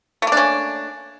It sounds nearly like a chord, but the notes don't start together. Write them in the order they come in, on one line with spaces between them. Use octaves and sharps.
A3 A#3 D4 C#4